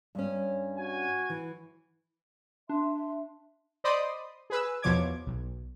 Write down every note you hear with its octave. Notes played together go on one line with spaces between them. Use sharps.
G2 C#4
F#4 G#5
E3
D4 E5 C6
C5 D5 D#5 B5 C6 D#6
G#4 B4 E6
E2 B2 F3 C#5 D6 G#6
B1